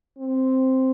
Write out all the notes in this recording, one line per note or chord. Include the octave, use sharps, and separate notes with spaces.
C4